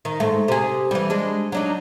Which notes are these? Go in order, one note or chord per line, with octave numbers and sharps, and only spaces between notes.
D#3
G#2 A3
C3 G#4
E3 G3
G#3 D4
F#3 D4 D#4